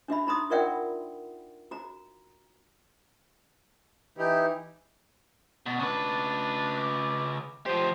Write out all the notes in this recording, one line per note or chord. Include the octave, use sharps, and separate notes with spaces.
D4 F#4 E5 B5
D#4 A#5 C6 D#6
F4 A#4 D5 E5 F#5 G5
F#4 A#5
E3 D#4 E4 G4
B2
C#3 D4 B4
D6
F3 G4 C5